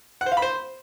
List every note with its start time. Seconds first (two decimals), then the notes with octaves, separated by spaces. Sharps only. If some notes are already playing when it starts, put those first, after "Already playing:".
0.21 F#5
0.26 C5
0.32 F5
0.37 B5
0.42 C5